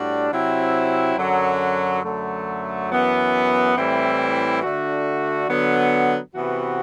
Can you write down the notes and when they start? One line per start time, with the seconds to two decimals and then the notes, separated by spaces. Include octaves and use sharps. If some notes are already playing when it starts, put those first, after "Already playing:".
Already playing: A2 G3 D4 F#4
0.31 C3 F#3 C4 E4
1.16 F#2 D3 F#3
2.03 F#2 D3 F#3 A3
2.89 F#2 E3 B3
3.76 A2 E3 G3 C4 E4
4.63 D3 A3 D4 F#4
5.48 D3 F#3 B3
6.35 C3 E3 B3 F#4